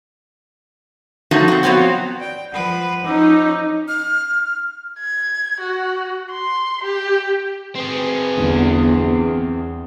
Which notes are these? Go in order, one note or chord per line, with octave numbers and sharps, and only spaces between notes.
F3 F#3 A3 D#4 F#4
C4 F#4
F3 F#3 B3 C4 F#4
D5 G5
F3 B4 F#5 B5
F3 C#4 D#4 D6 E6
F6
G#6
F#4
C6
G4
C4 G#4 B4
G1 E2